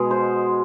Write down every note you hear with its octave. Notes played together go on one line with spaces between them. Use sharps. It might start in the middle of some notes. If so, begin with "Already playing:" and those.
Already playing: B2 G#3
C5